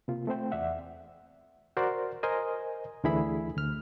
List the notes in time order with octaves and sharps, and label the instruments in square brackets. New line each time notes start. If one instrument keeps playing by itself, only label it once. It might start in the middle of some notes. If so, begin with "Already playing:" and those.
[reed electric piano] C3 A#3 F4
A3 C4 C5 G5
E2 D5 E5 F#5
F#4 A#4 C5 D5
A#4 C5 D#5 G#5
D2 D3 E3 E4 G#4 B5
D2 F6